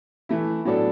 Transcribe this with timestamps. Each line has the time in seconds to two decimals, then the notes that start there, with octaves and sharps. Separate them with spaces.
0.29 E3 A3 E4
0.65 A2 F#3 B3 D4 A4